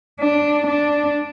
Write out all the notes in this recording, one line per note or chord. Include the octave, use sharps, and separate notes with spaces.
D4
D4